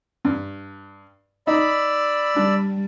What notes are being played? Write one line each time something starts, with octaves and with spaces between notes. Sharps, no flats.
G2
D#4 D5 B5 E6
G3 D4